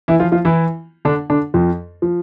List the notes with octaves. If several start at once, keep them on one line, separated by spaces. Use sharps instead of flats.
E3 E4
F3 F4
F3 F4
E3 E4
D3 D4
D3 D4
F2 F3
F3